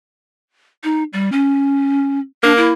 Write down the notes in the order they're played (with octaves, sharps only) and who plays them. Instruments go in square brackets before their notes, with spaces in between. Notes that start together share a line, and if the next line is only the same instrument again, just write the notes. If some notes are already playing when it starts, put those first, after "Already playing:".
[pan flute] D#4
G3
C#4
[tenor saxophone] A#3 [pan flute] D4
[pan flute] E4